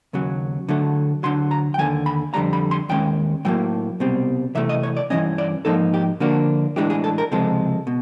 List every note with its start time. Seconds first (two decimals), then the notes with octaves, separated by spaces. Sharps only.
0.13 D#2 C#3 F#3
0.69 D3 F#3 A3
1.23 D2 D3 F#3 C6
1.51 A#5
1.74 G5
1.78 D#2 D3 F3 G#5
2.06 B5
2.34 F2 D3 G3 A#5
2.53 B5
2.71 C6
2.89 D#2 D#3 G#3 C#4 G5
3.45 A2 F#3 A#3 G5
4.00 C2 B2 G3 C4
4.55 C3 E3 A3 E5
4.69 D#5
4.83 C#5
4.97 D5
5.10 G2 E3 G#3 C#4 D#5
5.38 D5
5.65 G#2 F3 A#3 D#4 A4
5.94 G4
6.20 D3 F3 A#3 D4 F#4
6.76 A2 E3 G#3 B3 D4 G4
6.90 G#4
7.04 A4
7.18 A#4
7.32 C#2 C3 F3 G#3 A4
7.87 B2